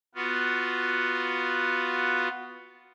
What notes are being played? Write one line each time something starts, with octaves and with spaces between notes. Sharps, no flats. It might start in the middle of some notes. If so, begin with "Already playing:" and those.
B3 F4 F#4